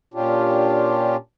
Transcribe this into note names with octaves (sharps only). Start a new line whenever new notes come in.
A#2 C#4 D4 F4 G4